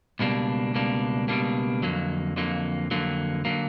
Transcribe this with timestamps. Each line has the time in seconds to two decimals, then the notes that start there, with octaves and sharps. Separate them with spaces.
0.19 C#2 B2 G3 A#3 D4
0.74 C#2 B2 G3 A#3 D4
1.28 C#2 B2 G3 A#3 D4
1.83 F2 D3 F#3 A#3
2.36 F2 D3 F#3 A#3
2.91 F2 D3 F#3 A#3
3.45 D3 F#3 A#3